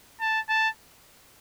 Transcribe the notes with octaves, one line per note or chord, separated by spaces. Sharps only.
A5
A5